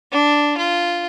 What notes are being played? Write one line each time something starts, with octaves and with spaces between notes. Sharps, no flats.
D4
F4